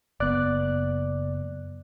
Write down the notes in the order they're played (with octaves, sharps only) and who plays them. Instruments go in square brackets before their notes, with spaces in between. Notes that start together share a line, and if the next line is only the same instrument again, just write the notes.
[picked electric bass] F#1 B3 [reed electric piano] D5 F#6